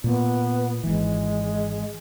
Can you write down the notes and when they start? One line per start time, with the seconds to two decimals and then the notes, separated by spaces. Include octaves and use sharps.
0.04 A#2 A#3 B3
0.84 G#1 E3 G#3